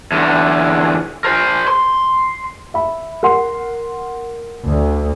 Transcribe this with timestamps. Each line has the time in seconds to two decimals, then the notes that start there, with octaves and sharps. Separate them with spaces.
0.12 E2 D3
1.24 A#4 C5
1.68 C6
2.74 E5 B5
3.23 A#4 F#5 C6
4.67 D2